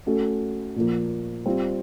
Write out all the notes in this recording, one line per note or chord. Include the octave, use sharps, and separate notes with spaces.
A3 C#4 F#4 A4
A#2 F3 A#3
G3 C4 F4